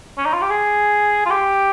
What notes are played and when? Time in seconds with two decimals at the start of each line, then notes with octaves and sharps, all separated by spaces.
0.18 C#4
0.25 D#4
0.33 F4
0.41 G4
0.50 G#4
1.26 F4
1.30 G4